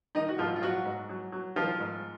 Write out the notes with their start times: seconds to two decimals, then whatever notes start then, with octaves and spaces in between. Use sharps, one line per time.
0.15 D#3 D#4 D#5
0.28 F#4
0.38 G#2 F3 F4
0.56 F4
0.62 G#2 F#3 F#4
0.85 G#2
1.09 F#3
1.32 F#3
1.56 D#3 F3 F4
1.80 G#2